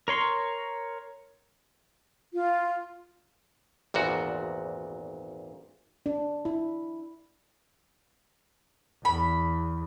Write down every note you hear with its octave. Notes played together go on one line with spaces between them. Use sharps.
A#4 C#5 C6
F4
G#1 E2 A#2 F#4
D4
E4
E2 B5